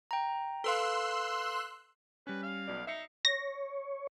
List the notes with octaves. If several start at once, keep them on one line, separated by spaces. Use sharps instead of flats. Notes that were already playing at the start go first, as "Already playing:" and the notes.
G5 A#5
A4 B4 F5 C6 E6 F#6
G3 C#4 B4
F5
B1 B2 D5
D#4 E5 C7 C#7
C#5 A#6